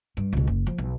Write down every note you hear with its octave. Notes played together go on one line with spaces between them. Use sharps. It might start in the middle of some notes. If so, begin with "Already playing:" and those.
G2
C#2 B2
F#1
F3
B1